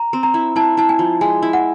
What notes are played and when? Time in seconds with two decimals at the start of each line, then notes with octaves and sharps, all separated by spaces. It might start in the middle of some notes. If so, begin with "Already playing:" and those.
Already playing: A#5
0.13 C4
0.23 A#5
0.34 E4
0.56 E4 A5
0.77 E4 A5
0.89 G#5
0.99 F3
1.21 G#3 G#5
1.42 E4
1.53 F#5